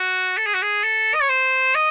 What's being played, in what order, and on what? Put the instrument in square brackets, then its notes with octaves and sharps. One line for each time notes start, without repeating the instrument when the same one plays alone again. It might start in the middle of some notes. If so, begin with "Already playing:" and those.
Already playing: [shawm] F#4
A4
G#4
F#4
G#4
A4
D#5
C#5
C5
D#5